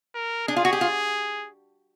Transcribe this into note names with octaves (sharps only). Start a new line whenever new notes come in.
A#4
D4 G#4
F4
F#4
G4
F4